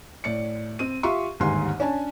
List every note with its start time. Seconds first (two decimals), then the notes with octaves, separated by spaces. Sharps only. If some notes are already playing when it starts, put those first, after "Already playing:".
0.24 A2 D5 C#7
0.79 C4 D#7
1.03 F4 G4 E5 C6 C#6
1.40 G1 D#2 G#2 D#3 G#5 C6
1.80 C#4 D4 G#5 A5